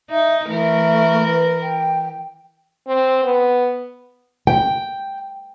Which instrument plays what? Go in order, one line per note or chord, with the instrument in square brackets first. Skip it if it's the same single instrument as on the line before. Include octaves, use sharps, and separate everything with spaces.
[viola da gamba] D#4 [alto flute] E5
[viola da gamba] E3 A#4 [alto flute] A3
[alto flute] B4
G5
[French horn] C4
B3
[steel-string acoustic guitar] G5